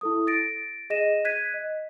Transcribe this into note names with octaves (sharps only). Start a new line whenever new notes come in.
E4 A4 D#6
A6 A#6 D7
G#4 D#5 A#6 D#7 E7
F#6 G#6 B6 D#7
D#5